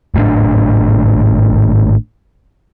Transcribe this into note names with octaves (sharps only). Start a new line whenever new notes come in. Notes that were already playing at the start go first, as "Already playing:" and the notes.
G#1 A2 D#3 D4